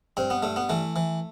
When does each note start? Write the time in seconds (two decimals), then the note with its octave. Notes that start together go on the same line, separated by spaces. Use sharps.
0.17 G2 C4
0.30 B3
0.42 G2 A3
0.56 B3
0.69 E3 A3
0.96 E3